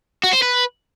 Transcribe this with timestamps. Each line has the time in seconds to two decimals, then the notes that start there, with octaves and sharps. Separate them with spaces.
0.23 F#4
0.33 C5
0.42 B4